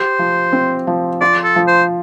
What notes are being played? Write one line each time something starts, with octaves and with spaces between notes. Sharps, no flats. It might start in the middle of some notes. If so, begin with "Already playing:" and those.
Already playing: G4 C5
F3
C4
F3
F4 D5
A4
F3
C5